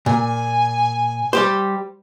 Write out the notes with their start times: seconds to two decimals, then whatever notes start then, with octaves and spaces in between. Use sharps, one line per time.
0.06 A#2 G#5
1.33 G3 G4 C5